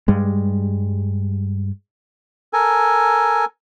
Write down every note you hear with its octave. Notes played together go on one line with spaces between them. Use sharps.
G2 G3 G#3
A4 A#4 G#5